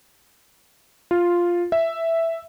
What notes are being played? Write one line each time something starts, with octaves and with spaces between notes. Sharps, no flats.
F4
E5